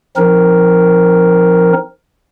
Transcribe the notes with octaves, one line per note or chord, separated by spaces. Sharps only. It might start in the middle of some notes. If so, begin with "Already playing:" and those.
F3 C4 D#4 A#4